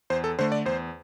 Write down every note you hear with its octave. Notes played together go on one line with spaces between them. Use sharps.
E2 C5
A4
D3 A3 C5
D5
E2 C5